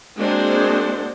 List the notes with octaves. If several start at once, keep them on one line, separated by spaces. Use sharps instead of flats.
G#3 A#3 C4 D4 F#4 C5